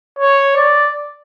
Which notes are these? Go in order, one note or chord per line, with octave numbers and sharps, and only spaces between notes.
C#5
D5